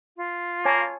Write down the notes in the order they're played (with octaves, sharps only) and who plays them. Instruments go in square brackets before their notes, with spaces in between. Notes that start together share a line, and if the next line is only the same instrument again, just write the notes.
[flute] F4
[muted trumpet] A#3 [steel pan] C#5 G#5 A5